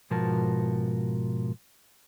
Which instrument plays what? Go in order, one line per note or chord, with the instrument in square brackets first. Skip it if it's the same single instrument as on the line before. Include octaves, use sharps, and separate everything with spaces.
[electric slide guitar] G#2 B2 F3 F#4 A#4 A5